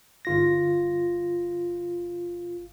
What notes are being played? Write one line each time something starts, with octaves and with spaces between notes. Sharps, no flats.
G1 F4 A#6